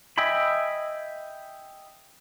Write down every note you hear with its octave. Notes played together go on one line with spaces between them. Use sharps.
D#5 E5 G5 G#5 B5